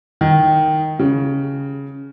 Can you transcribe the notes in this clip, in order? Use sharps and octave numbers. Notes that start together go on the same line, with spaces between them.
D#3
C#3